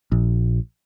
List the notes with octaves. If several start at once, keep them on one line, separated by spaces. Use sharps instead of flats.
A#1